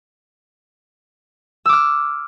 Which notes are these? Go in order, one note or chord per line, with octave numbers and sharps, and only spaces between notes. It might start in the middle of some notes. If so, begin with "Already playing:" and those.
D6 E6 F6